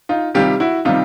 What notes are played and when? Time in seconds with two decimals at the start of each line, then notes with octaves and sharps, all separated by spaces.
0.09 D#4 F4
0.35 C3 D#3 G3 F4 G4
0.60 E4 F#4
0.85 C3 D#3 G3 D#4 F4